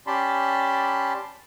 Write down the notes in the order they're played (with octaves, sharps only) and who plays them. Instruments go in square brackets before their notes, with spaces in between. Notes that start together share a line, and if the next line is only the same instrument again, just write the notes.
[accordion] C#4 G4 D5 A5 B5 C6